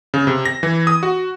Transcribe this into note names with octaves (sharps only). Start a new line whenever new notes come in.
C#3
C3
A#6
E3
D#6
F#4